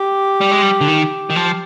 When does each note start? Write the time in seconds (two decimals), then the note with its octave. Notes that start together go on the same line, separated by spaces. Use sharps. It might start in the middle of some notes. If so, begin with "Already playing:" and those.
Already playing: G4
0.41 G3
0.51 G#3
0.62 G3
0.81 D3
0.88 D#3
1.30 D#3
1.36 F3